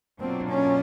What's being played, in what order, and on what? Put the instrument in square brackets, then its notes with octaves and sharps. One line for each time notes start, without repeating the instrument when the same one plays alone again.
[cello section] B2 F#3 A#3 D4 F4 [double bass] C4
[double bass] C#4